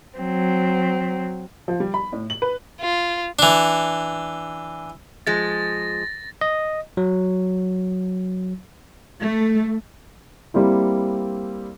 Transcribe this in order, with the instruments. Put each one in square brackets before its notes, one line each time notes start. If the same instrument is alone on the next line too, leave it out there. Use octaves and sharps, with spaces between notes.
[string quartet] F#3 C4
[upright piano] F3
G3
B5
A2
F#7
B4
[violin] F4
[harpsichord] E3 D4
[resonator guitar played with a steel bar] F3 G#3 [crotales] A6 A#6
[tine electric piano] D#5
F#3
[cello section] A3
[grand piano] G3 A#3 C4 E4